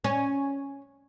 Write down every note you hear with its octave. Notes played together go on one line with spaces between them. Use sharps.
C#4